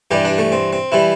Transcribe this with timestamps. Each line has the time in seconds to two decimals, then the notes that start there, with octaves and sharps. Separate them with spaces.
0.11 G2 E3 G3 G4
0.25 D4
0.38 A3
0.52 C4
0.73 C4
0.92 E3 G3 E4